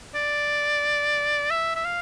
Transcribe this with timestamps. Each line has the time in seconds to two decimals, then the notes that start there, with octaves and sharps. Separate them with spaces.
0.15 D5
1.50 E5
1.76 E5
1.85 F5